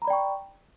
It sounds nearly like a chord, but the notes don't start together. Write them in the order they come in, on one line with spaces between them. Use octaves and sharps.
A#5 B5 D5 G5 C#6